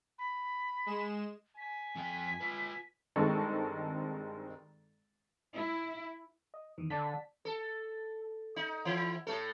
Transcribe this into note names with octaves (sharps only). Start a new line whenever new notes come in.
B5
G#3 E7
G#5 B6
F2 G5
F4 B4
G2 D#3 G#3 C4 A4 C#6
E4
D#5
E2 D#3 E3
D3 D5 A5 B6
A4
D#4
E3 E4
A2 A3 A4